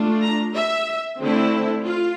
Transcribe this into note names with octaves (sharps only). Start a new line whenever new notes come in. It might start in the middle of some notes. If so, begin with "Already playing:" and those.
Already playing: A3 D4 F4
A#5
E5
D3 A3 C4 E4
F4